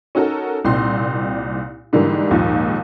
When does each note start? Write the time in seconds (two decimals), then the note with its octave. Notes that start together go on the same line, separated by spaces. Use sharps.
0.15 C#4 D#4 F#4 A4 A#4
0.65 C2 A#2 C4 D#4 C6
1.93 G#2 D3 E3 G3 A#3
2.31 A#1 D#2 G#2 F3